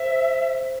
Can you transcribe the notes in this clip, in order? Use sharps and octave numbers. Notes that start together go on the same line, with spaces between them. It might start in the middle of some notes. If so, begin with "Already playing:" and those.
Already playing: C5 E5